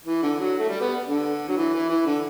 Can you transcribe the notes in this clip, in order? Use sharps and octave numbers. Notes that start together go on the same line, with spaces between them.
E3
D3
F#3
A3
G3
B3
D3
F#3
E3
E3
E3
D3